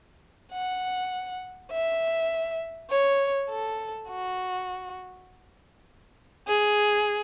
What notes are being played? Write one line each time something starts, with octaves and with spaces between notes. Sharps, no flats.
F#5
E5
C#5
A4
F#4
G#4